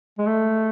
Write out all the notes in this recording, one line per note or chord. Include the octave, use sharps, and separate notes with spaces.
G#3
A3